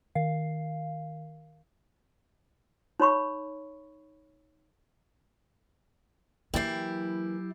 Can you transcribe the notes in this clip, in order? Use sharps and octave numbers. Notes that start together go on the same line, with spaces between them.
D#3 F5
D#4 C#5 B5 C#6
E3 F#3 A#3 E4 G4 G5 A6 C7